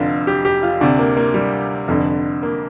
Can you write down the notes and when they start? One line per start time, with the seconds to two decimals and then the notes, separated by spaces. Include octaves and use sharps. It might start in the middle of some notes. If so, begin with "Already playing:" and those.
Already playing: F1 F2 D3 F4
0.27 G4
0.45 G4
0.63 F4
0.81 D2 C3 D4
0.99 A#3
1.17 A#3
1.34 G3
1.88 F1 F2 D3
2.43 A#3